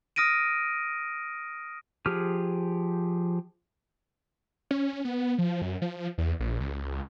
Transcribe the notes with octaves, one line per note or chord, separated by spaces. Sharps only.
D#6 F6 A#6 D7 D#7
F3 G4 G#4 F6
C#4
B3
F3
F#2
F3
E2
A#1
C#2